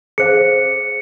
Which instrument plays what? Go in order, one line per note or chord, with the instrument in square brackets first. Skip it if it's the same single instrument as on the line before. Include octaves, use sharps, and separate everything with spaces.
[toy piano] G#4 C5 F5 [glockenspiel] C#7